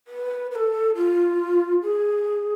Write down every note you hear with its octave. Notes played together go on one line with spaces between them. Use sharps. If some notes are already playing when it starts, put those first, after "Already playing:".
B4
B4
A4
F4
G#4